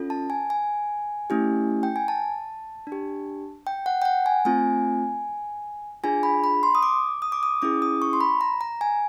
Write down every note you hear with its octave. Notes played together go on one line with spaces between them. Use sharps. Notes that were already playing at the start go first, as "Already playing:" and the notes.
Already playing: C#4 F4 A4
A5
G#5
G#5
A3 C#4 E4 G4
G5
G#5
A5
D4
G4
G5
F#5
G5
F#5
G#5
A3 C4 F4 G#5
D4 F4 G#4 G#5
B5
B5
C6
D#6
D6
D#6
D6
D#6
C#4 E4 G#4 D6
D#6
C#6
C6
B5
A#5
A#5
G#5